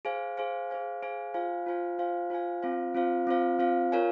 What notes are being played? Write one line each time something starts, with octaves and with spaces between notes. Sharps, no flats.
G#4 C5 F5 G#5
G#4 C5 F5 G#5
G#4 C5 F5 G#5
G#4 C5 F5 G#5
F4 C5 F5 G#5
F4 C5 F5 G#5
F4 C5 F5 G#5
F4 C5 F5 G#5
C4 F4 C5 F5
C4 F4 C5 F5
C4 F4 C5 F5
C4 F4 C5 F5
F4 A#4 C#5 F5 G#5